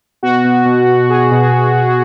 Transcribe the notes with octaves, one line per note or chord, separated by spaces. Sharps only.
B2 F#4
B2
B2
B2
B2 G#4
B2
B2
B2